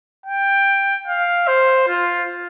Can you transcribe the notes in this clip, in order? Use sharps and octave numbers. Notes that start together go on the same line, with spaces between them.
G5
F5
C5
F4